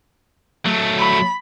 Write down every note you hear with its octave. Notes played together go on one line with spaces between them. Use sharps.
F#3 A3
B5